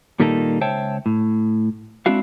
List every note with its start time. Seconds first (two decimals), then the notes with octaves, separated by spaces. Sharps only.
0.20 A#2 D#3 G3 A#3 D#4 A4
0.61 C#2 C5 C#5 E5 G5 A5
1.06 A2
2.06 G#3 C4 D4 E4 F#4 F5